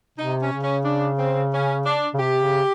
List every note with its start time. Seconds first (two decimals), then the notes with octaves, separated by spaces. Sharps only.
0.18 C3 D#4
0.41 C#4
0.52 C#3
0.63 C#4
0.85 D4
1.19 C4
1.52 C#4
1.86 D4
2.14 C#3
2.19 C3 G4
2.42 C#3